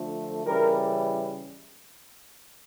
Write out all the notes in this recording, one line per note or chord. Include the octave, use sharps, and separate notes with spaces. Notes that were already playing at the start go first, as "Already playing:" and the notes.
Already playing: D3 F3 A3
C#3 E3 G3 A#4